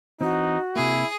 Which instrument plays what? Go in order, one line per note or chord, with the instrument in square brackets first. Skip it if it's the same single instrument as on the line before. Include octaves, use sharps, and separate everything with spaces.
[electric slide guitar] E3 C4 [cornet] D#4 [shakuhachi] F#4
[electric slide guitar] C3 A#3 [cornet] E4 [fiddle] G#4 D#6